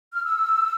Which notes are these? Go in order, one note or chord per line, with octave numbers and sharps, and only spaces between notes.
F6
E6